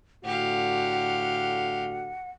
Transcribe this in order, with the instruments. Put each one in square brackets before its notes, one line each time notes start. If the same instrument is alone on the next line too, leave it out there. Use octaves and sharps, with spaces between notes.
[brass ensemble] A2 D3 F#4 [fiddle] G4 F5 [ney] F#5